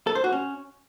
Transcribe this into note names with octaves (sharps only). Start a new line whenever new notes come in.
A4
C5
F#4
C#4